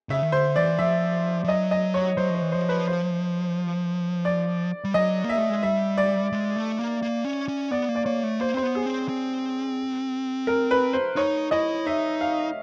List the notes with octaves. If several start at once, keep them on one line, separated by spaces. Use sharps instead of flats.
C#3 E5
D#3
D3 C5
E3 D5
F3 E5
F3
F#3 D#5
D#5
C#5
F#3 C5
F3 C5
E3
F3 C5
B4
C5
D5
G3
F#3 D#5
A#3
E5
A3
G#3
G3 E5
D5
G#3
A3
A#3
A#3
C#4
C#4
B3 D5
A#3
D5
A#3 C#5
A3
A#3 C5
C4 C5
B3
G#4
C4
C4
A#4
B4
C5
D#4 C#5
E4 D#5
D#4 E5
F5